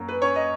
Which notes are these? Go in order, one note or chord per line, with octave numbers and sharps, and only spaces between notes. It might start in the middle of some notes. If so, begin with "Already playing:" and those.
Already playing: F#2 A#3
B4
C#4 C#5
D#5